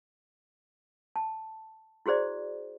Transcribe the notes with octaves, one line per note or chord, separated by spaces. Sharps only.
A5
E4 F#4 G#4 C5 D5